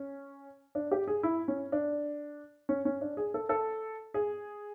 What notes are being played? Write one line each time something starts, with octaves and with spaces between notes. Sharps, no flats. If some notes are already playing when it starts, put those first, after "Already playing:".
Already playing: C#4
D4
G4
G#4
E4
C#4
D4
C#4
C#4
D4
G#4
A4
A4
G#4